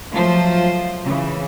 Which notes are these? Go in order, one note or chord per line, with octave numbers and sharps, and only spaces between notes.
F3 F#3 A3 F4 C5
C#3 E3